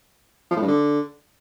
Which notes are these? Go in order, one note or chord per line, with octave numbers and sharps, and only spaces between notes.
F3
A2
G2
D3